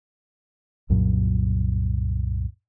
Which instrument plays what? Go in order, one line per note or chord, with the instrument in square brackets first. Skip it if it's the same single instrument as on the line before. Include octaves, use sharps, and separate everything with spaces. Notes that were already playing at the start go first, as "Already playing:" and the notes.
[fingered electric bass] C2 F#2 A#2 F#3